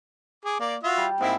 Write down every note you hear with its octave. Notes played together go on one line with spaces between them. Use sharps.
G#4 D6
A#3 D5
F4 F#4 E5
G3
G#2 A#3 C4 E4